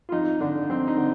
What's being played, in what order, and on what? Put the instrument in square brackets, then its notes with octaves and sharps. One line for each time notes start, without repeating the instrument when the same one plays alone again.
[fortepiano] F4
F2 D#4
D3 D4
F2 C4
D#4
D3